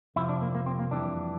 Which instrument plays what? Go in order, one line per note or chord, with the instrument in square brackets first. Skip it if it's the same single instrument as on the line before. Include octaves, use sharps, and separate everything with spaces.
[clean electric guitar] F2 C3 F3 E4
D4
A#3
A#3
C4
A#3
F2 E3 G3 D4